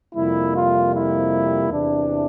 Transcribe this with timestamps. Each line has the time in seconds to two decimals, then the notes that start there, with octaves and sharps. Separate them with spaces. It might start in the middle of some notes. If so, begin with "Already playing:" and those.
0.15 F2 C3 G3 A#3 E4
0.54 F4
0.92 E4
1.70 E2 C3 E3 D4